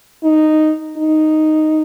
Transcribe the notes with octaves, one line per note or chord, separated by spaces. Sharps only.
D#4
D#4